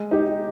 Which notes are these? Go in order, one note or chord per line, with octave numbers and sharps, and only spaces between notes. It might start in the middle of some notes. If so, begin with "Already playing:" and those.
Already playing: G#3
D#4 G4